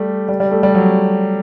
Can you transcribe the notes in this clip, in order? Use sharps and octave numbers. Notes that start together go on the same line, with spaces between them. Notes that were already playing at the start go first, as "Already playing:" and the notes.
Already playing: G3 A3
G3
G3
A3
G3
F#3